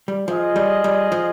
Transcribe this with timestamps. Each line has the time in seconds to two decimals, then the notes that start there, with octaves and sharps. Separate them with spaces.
0.08 G3
0.28 F3 F4 G#4 D#5
0.56 G3
0.84 G3
1.12 F3